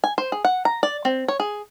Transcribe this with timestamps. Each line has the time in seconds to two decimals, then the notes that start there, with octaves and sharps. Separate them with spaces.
0.04 G#5
0.18 C5
0.32 G#4
0.45 F#5
0.65 A#5
0.83 D5
1.05 C4
1.28 C#5
1.40 G#4